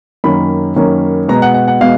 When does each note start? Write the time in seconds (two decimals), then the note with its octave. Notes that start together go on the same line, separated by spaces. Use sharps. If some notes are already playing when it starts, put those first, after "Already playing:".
0.24 F#2 D#3 A#3 C#4 B5
0.76 F#2 D#3 A#3 C#4
1.28 B2 G#3 B3 A#5
1.42 F#5
1.54 F#5
1.68 F#5
1.81 B2 G#3 B3 F5